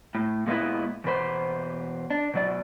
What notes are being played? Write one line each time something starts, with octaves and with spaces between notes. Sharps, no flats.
A2
A#2 G#3 A3 B3 E4
E2 B2 B4 C5
D4
B2 F#3 D5